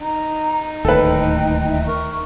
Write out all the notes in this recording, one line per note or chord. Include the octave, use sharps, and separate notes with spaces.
D#4 A#5
D1 D#2 A2 A4 B4 G5
E5
A#4 C#6